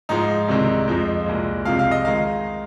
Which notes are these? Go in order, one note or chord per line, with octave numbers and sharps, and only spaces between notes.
G#2 F3 G#3 D#4
C2 C3 D#3 G#3
F2 F3 G#3
C2 A#2 G#3
C2 C3 F3 G#3 F5
F5
D#5
D#3 G#3 F5